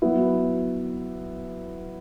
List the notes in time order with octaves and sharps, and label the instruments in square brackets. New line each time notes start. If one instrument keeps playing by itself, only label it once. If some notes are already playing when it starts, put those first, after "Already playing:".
[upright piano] F#3 B3 E4